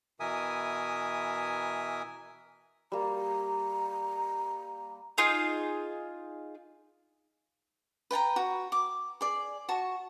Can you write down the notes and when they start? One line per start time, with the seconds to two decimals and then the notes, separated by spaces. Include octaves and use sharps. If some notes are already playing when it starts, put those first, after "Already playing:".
0.20 B2 E3 A#4 E5 G#5 D#6
2.92 G3 A#3 A#5
5.18 D#4 F4 G#4 F5
8.11 B4 G5 A5 A#5
8.36 F#4
8.72 D6
9.21 G#4 D5
9.69 F#4 A5 C#6